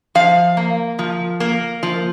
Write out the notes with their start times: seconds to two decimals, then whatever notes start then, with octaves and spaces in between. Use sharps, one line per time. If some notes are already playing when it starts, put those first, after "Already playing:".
0.15 F3 F5
0.57 A#3
0.99 F3
1.40 A#3
1.83 F3